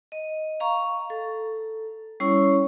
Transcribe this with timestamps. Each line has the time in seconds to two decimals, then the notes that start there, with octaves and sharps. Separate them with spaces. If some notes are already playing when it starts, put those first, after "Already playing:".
0.12 D#5
0.60 F5 A#5 C#6
1.10 A4
2.20 G3 C#4 E4 C#5 C#6